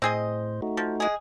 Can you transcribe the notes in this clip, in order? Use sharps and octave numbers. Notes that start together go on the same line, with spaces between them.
A2 C4 G#4 C5 D#5
A3 D#4 F#4
F3
G#3 G#4